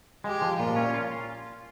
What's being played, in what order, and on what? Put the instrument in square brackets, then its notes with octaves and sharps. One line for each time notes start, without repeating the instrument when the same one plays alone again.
[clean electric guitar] G#3 [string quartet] G4
[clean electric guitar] F3
[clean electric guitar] A#2 [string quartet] F4
[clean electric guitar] C#4
F4